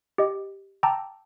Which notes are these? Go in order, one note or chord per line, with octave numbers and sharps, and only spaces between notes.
G4 D#5
G5 A5 A#5 D6 E6